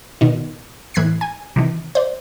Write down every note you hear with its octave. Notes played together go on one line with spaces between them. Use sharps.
B2 D#3
A2 E3 F#6 G#6 B6 C7
G#5
C3 D#3 E3
C5 D5